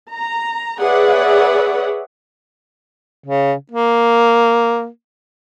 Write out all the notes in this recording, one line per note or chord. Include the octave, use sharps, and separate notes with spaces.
A#5
G#4 B4 C#5 D5 E5 F#5
C#3
A#3